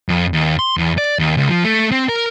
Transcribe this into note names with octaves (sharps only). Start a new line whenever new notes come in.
F2
D#2
C6
E2
D5
D#2
C#2
F3
A3
C4
A#4